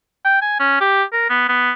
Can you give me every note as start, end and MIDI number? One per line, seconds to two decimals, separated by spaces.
0.25 0.40 79
0.42 0.59 80
0.59 0.76 61
0.81 1.03 67
1.12 1.26 70
1.30 1.48 59
1.49 1.72 59